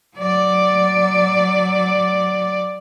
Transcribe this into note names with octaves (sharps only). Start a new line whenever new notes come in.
F#3 D5